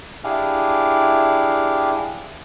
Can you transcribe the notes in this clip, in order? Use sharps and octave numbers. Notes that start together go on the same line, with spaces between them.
D4 E4 G4 G#4 F5